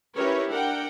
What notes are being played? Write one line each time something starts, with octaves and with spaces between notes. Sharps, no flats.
C#4 E4 G4 A#4 B4 C#5
D4 A#4 F#5 G5